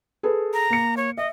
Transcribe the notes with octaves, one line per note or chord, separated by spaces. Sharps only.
G#4 A4 B4
A#5
A#3 C#7
C#5
D#5 E5